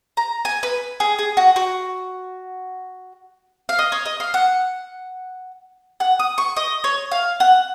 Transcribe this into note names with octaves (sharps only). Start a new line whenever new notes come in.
A#5
G#5
B4
G#4
G#4
F#4
F#4
F5
D#5
C#5
D#5
F5
F#5
F#5
D#6
C#6
D#5
C#5
F5
F#5